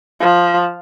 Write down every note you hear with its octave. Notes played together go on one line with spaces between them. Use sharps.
F3